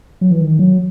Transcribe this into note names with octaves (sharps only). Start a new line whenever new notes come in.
F#3
E3
D#3
F#3